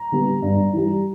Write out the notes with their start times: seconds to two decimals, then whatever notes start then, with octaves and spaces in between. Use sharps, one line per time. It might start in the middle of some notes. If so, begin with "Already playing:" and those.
Already playing: A#5
0.12 D3 G3 B3
0.42 G2
0.73 E3 G3